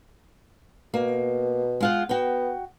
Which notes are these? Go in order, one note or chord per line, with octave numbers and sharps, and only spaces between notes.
B2 A#3
G#3 F4 F#5
B3 F#4 G5